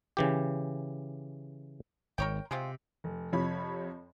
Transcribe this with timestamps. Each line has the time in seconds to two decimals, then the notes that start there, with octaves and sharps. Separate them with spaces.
0.17 C#3 E3 G4
2.18 G#1 A#4 C#5 G5
2.51 C3 G#3 C4 F4
3.04 F1
3.32 F2 C3 F3 C#5 B5